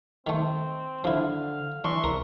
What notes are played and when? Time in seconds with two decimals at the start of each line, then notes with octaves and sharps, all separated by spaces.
0.27 D#3 A3 C4
1.04 D3 F3 E4 F5
1.84 E3 D4 E5 C6 C#6
2.04 C2 A#4